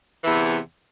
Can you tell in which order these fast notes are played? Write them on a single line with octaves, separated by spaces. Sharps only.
E3 E2 C3